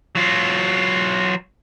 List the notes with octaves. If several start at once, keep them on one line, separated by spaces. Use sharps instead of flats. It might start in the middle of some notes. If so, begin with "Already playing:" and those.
F#3 F4